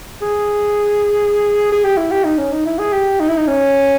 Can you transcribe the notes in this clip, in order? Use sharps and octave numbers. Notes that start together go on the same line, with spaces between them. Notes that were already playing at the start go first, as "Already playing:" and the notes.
G#4
G#4
G4
E4
G4
D#4
C#4
D#4
E4
G#4
G4
D#4
E4
D#4
C#4